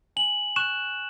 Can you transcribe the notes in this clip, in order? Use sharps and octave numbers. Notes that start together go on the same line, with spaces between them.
G#5 F#7
C#6 F#6 E7